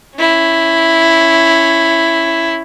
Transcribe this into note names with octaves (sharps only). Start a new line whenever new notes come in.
C#4 E4